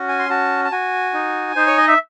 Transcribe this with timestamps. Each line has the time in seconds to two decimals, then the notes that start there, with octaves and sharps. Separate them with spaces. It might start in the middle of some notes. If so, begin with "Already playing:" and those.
Already playing: C#4 F#4
0.09 G#5
0.19 C6
0.30 F#4 A5
0.65 A5
0.72 F#4 G#5
1.14 D#4
1.56 D#4 C5
1.67 C#5
1.77 D#5
1.88 E5